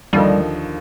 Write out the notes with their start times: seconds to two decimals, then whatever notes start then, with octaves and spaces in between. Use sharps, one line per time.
0.13 D#2 D3 F3 G3 A#3 D#4